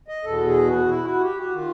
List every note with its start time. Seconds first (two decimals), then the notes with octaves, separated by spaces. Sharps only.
0.08 D#5
0.24 E2 B2 A4
0.46 G#4
0.67 F#4
0.89 E4
1.05 F#4
1.21 G4
1.37 F#4
1.53 D#3 F4